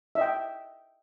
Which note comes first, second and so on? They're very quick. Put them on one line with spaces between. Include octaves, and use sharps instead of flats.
E5 D#5 G5